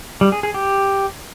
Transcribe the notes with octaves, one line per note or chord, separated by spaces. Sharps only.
G3
G#4
G#4
G4